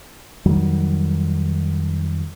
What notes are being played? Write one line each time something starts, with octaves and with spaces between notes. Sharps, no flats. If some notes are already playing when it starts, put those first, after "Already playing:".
F2 D#3 F#3 G3